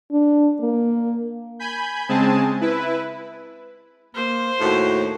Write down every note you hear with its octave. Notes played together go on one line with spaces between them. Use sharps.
D4
A#3
G#5 B5 G6
C#3 G#3 C4 G#4 G#5 A5
E4 B4
A#3 C5
D#2 A2 F#4